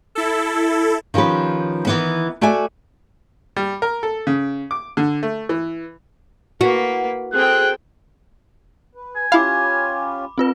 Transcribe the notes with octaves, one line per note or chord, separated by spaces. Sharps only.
E4 A4
D#3 F3 C#4 G4 B4
D#3 E3 B3
A3 F#4 D5 E5 G#5
G3
A#4
A4
C#3
D6
D3
A3
E3
A#3 F#4 B4
C4 G#4 A4 G5 F#6
B4
G#5
C#4 E4 F4 G4 F5 B5 D6
C4 F4 B4